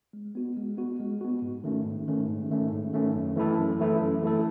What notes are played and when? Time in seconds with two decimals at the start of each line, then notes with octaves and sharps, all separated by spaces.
0.13 G#3
0.35 B3 F#4
0.57 G#3
0.77 B3 F#4
1.00 G#3
1.21 B3 F#4
1.42 G#2
1.64 D#3 A3 C#4
1.85 G#2
2.08 D#3 A3 C#4
2.29 G#2
2.50 D#3 A3 C#4
2.72 G#2
2.93 D#3 A3 C#4
3.15 F#2
3.36 E3 A3 E4 A4
3.58 F#2
3.80 E3 A3 E4 A4
4.01 F#2
4.22 E3 A3 E4 A4